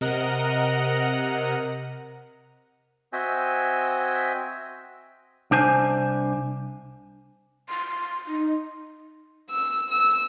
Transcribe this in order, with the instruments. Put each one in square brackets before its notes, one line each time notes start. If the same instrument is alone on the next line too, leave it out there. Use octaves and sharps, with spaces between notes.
[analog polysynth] C3 A#4 D#5 F#5 A#5
[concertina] C4 F#4 D#5 E5 G5 G#5
[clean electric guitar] C2 D4 C5 G#5
[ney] C6
D#4
[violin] E6
E6